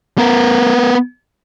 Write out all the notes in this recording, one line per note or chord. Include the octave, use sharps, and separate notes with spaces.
B3 A#4